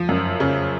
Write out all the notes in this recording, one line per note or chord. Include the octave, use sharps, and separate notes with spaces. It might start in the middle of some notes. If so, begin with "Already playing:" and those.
Already playing: F3
F#2
C#3